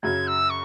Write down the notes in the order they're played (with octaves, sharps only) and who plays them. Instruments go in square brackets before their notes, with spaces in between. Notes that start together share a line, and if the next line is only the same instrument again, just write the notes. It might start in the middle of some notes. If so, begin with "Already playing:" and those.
[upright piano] F#2 C#3 F#3 [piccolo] G#6
[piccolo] E6
C#6